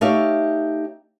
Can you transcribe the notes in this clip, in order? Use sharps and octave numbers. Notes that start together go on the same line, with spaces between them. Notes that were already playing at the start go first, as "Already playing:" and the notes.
A3 D#4 G4 C#5 E5 F5